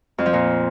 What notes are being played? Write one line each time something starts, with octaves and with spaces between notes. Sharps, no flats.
F2
F3
A#2